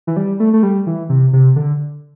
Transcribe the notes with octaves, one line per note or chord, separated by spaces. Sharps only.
E3
G3
A3
A3
G3
E3
C3
C3
D3